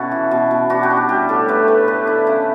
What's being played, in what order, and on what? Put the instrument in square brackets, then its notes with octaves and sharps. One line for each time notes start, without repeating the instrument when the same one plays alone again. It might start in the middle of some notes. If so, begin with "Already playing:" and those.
Already playing: [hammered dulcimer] B2 C#4 E4 F#4 A4
E3
B2
B2
D4 F#4
G4
D4
G4
G3 G4
A2 A4
A3 B4
A3
D4 B4
D3 E4
C#3 E4